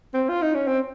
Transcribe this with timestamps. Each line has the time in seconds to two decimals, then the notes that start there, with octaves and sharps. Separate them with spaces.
0.14 C4
0.29 F4
0.42 D#4
0.55 C#4
0.67 C4